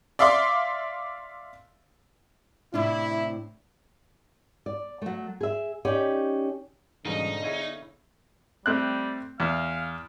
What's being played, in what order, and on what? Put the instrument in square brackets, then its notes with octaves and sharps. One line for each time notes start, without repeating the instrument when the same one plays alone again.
[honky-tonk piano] D5 E5 F5 C6 D6
[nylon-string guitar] A2 C3 D4 [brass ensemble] E4
[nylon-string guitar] D5
F#3 A3
G#4 E5
C#4 D#4 G4 D5
[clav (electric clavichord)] G#2 B2 F5 [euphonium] D3 [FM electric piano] E3 G3 C#4 [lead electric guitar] D#4
[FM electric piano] B3 D4 G#4 [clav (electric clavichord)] E4 C#5 F5
[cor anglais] G3 [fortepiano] A3 C4 F#6
[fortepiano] E2 [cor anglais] F5